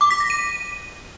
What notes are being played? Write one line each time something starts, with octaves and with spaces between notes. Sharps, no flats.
D6
B6
A#6
D#7